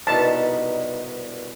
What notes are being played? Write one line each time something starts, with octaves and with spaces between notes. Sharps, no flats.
C2 G2 B2 D#4 A5